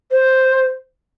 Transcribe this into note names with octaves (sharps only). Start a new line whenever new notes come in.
C5